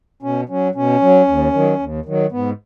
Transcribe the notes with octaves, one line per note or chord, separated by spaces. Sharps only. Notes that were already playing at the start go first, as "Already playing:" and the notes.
B2 C#4
F#3 C#4
B2 C#4
F#3
D#2
D#3 F#3
D#2
D#3 F#3
G#2 B3